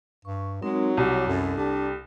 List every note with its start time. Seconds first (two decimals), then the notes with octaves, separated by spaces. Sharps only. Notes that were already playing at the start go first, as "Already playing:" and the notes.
0.25 G2 C#6
0.62 F#3 G#3 C4 D#4 A#4
0.97 C2 G4 C#5
1.27 F#2 A4
1.57 D4 G4